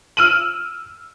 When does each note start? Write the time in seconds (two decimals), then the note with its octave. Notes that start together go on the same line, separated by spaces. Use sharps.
0.17 E6 F6 D7 D#7 F#7